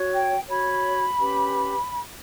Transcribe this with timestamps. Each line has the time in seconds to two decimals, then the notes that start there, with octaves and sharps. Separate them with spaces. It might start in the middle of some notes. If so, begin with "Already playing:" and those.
Already playing: F#4 C#5
0.13 G5
0.47 F#4 C#5 B5
1.18 C#4 G4 B4